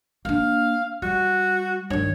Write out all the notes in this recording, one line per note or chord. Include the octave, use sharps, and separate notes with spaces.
A#3 D4 F5
G3 F#4
G2 D#3 C#5